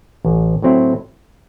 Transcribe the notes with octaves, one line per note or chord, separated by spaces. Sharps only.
A1
A2 F#3 C4 E4